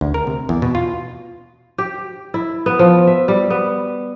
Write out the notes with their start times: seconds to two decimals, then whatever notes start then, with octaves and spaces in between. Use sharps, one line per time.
0.01 D2
0.14 A#4
0.27 C3
0.49 E2
0.62 B2
0.75 F4
1.78 G4
2.34 E4
2.66 B3
2.79 F3
3.07 E5
3.28 G3
3.50 B3